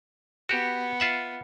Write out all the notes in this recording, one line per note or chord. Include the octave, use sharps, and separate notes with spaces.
B3 F#4 G4
F4 E5 F#5